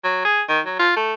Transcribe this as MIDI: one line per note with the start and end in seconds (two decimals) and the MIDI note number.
0.04 0.23 54
0.25 0.42 68
0.49 0.60 51
0.66 0.78 54
0.79 0.95 65
0.97 1.14 57